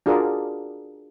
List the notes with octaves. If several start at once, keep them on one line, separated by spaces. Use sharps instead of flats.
D4 F4 F#4 G#4 A#4 D5